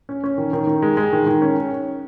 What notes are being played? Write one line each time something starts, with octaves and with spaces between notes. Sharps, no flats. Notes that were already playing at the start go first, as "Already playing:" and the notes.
C#4
C#4
D#3
D#3
D#3
G#3
G#3
D#3
D#3
C#4